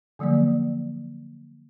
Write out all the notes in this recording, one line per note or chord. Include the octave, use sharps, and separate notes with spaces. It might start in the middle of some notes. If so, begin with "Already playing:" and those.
D3 F3 F#3 A#3 D5